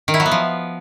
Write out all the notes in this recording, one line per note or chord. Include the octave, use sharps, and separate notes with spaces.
D#3
E4
F#3
B3
F3